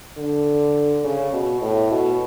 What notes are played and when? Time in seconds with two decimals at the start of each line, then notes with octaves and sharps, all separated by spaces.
0.17 D3
1.04 C#3
1.33 B2
1.62 A2
1.91 B2